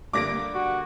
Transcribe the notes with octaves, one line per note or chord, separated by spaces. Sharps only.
D3 G3 A#3 D6 A#6 D7
F#4